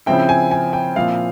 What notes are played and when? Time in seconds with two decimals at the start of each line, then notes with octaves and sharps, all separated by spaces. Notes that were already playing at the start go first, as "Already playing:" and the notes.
0.06 C#3 F3 C4 E4 G5
0.29 G#5
0.51 G#5
0.73 G5
0.96 A#2 F3 C4 E4 F5